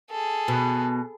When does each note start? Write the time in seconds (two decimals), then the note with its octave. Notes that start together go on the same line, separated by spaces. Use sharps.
0.11 G#4 A4
0.48 B2